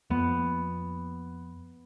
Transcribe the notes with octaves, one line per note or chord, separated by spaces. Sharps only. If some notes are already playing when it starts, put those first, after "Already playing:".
F2 B3